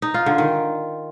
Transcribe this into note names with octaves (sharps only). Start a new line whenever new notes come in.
D#4
F4
D3
D#3